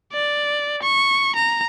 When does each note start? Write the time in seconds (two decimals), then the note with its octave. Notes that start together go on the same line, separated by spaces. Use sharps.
0.13 D5
0.83 C#6
1.36 A#5